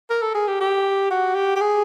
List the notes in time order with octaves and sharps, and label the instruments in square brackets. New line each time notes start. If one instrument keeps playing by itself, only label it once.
[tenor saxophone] A#4
A4
G#4
G4
G4
F#4
G4
G4
G#4